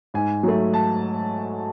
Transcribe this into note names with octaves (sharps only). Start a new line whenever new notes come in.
G#2 G#5
F#3 A3
A5